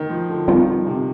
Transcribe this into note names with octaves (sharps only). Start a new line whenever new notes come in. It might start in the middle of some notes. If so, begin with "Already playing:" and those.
Already playing: D#3
F3
D3
D#3 G3 C4 F4
C3